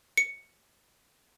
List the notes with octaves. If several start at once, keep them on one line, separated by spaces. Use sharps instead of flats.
C#7